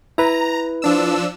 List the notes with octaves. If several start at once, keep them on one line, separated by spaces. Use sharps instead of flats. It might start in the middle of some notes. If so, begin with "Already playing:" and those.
E4 B4 A#5
F3 D4 E6